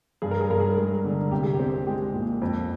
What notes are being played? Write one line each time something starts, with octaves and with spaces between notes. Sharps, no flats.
G2 G#4
A#4
G#4
G2 A#4
G#4
A#4
G#3 G#4
D3
C2 G4
G#4
G4
C4
G#3 G4
A#2
F2